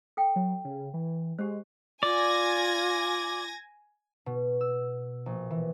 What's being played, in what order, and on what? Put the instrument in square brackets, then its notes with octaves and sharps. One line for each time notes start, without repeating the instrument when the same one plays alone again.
[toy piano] A4 G5
[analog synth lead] F#3
C#3
E3
[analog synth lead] G#3 [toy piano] G4 C5
[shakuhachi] F4 [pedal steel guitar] D5 [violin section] G#5 G#6 A#6
[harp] B2
E6
A#1
E3